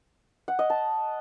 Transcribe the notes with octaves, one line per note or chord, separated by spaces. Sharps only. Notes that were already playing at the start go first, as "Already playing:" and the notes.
F#5
D#5
A5